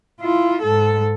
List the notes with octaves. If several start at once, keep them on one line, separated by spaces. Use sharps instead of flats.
E4 F4
G#2 A4